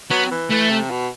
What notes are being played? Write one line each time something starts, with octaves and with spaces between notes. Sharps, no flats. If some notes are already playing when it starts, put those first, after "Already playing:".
F#3 B3
E3
E3 A3
C3
B2